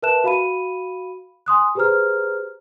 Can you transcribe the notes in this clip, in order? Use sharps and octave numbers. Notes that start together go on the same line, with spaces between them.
A#4 B4 E5 A5 F#6 E7
F#4 F5 B5 D#7
G#5 C6 D#6 F#6
G4 G#4 B4 C5 A#5 F6